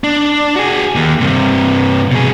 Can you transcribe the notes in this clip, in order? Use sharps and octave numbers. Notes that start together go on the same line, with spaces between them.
D4
F#4 G#4
D#2
G2 C3
B2 G#4